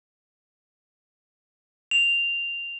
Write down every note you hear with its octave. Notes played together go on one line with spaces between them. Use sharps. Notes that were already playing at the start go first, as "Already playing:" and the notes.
F7